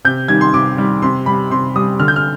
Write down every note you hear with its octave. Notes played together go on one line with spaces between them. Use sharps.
C3 G6
D#3 G3 G#6
C6
C3 D6
D#3 G3
C3 C6
G3 B5
C3 C6
G3 D#6
D3 F6
G6
F6